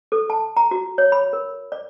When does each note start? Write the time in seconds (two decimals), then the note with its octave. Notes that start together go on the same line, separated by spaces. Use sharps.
0.12 A4
0.30 A5
0.57 A#5
0.71 F#4
0.98 C#5
1.12 B5
1.33 A#4
1.72 D5